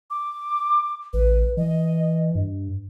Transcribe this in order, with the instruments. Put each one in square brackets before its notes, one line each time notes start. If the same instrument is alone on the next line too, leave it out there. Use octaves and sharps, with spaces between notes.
[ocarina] D6
[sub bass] A1 [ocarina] B4
[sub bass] E3 [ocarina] D#5
[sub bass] G2